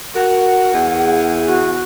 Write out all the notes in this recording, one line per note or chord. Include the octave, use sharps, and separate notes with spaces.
F#4 A#4 F#5
E2 E4 G#4
F#4